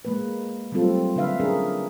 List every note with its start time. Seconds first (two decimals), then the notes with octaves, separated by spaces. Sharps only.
0.05 G#3 A#3 B4
0.72 F#3 G3 A3 C4 F4 A4
1.16 D3 D4 B4 E5 F5
1.40 C#4 D4 G#4 A#4